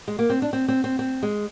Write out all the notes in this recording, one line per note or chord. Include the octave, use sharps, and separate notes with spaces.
G#3
A#3
C4
D4
C4
C4
C4
C4
G#3